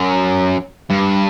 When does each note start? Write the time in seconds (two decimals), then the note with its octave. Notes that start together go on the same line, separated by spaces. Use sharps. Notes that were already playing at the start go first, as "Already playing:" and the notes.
Already playing: F#2
0.90 G2